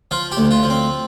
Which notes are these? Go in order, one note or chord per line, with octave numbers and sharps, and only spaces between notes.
F3 F4
G4
D2
F4
F3
C4